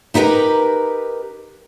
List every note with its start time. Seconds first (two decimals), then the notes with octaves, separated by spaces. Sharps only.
0.14 D#4 E4 G4 A#4 B4 A#5